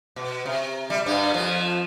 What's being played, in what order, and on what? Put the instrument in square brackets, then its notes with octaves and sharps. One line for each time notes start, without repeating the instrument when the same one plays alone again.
[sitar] B2
C3
G3
G2 G3
F2 F3